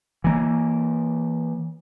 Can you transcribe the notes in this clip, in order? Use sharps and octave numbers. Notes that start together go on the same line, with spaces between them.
E3 A#3